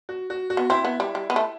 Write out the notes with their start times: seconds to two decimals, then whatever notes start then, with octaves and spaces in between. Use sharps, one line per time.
0.09 F#4
0.30 F#4
0.50 F#4
0.57 B3
0.70 C4 E4
0.85 B3
1.00 G3
1.15 G3
1.30 B3
1.36 A3